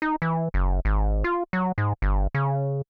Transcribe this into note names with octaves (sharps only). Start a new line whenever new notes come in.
D#4
E3
F#1
G#1
F4
F#3
G#2
G1
C#3